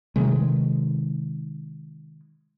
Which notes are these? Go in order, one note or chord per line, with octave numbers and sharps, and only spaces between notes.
C3 D#3 F#3 G#3